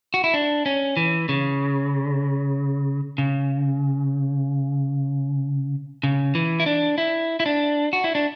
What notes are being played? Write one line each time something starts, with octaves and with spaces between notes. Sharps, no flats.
F#4
E4
D4
C#4
E3
C#3
C#3
C#3
E3
E4
D4
E4
E4
D4
F#4
E4
D4